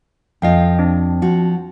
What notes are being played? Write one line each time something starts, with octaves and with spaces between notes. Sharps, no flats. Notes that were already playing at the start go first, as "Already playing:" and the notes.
F2 F4 D#5 F5 G5
C4 D4
F3 F#4